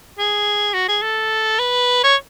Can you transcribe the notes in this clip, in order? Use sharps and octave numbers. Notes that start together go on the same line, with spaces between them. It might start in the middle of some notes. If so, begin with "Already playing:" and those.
G#4
F#4
G#4
A4
B4
C#5